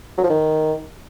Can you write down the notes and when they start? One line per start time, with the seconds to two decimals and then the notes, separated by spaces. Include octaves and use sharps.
0.18 F#3
0.24 F3
0.30 D#3